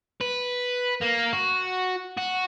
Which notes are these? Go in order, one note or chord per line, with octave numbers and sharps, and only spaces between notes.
B4
A#3
F#4
F#4